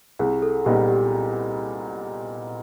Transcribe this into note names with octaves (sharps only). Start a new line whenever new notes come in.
C2 G#4
A4
A#2 G3 B3 D#4 G4
G4